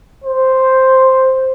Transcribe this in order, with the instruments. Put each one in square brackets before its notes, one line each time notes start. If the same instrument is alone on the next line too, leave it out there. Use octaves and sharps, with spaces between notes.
[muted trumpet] C5